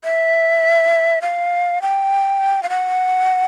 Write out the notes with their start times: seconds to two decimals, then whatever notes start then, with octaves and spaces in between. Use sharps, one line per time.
0.04 E5
1.22 F5
1.82 G5
2.63 F5
2.70 F#5